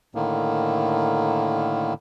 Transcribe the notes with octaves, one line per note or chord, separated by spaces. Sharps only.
A2 D3 D#3 A#3